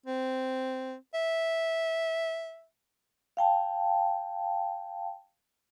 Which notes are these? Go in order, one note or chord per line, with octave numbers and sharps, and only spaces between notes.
C4
E5
F5 G5 A5